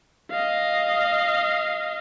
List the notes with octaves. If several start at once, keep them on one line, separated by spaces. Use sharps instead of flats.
D#5 F5